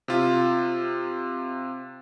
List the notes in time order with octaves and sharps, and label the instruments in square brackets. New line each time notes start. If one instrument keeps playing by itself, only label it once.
[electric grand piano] C3 F4